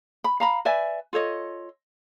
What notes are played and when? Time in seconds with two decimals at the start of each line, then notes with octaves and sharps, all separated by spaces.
0.24 B5
0.40 F5 A#5 B5
0.65 B4 D5 E5 G#5
1.13 F4 A4 C#5 D#5